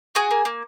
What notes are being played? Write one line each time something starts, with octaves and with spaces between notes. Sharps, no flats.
F#4 G#4 G#5
A#3
A#3